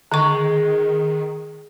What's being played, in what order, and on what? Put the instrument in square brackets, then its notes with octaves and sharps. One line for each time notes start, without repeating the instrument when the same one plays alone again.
[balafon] D3 C#6 [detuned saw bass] D#3 [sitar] G#3